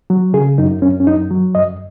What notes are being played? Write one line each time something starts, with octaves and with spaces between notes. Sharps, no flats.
F#3
C#3 G#4
F#2 D#4
F#2 C#4
C#4
F#2 D#4
F#3
F#2 D#5